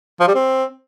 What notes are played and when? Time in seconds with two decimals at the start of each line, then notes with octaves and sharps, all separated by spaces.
0.20 F3
0.28 G3
0.35 C4